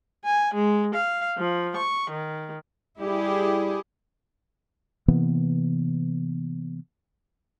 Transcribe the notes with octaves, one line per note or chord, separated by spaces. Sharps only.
G#5
G#3
F5
F3
C#6
D#3
G3 E4 G4 G#4
C3 E3 A#3 B3